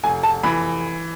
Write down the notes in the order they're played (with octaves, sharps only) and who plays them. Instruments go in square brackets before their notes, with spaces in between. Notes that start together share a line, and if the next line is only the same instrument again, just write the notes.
[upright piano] F1 G#5
A5
E3 B5